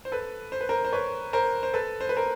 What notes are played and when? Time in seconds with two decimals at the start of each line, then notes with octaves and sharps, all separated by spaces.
0.05 C5
0.12 A4 B4
0.52 C5
0.61 B4
0.69 A#4 C5
0.85 C5
0.93 B4 C#5
1.33 A#4 C5
1.63 C5
1.74 A4 B4
2.01 C5
2.09 B4
2.17 A#4 C5